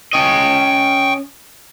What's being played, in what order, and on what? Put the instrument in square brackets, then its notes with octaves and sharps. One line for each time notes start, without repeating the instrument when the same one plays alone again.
[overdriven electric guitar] C#4 D#5 [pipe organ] G5 C#6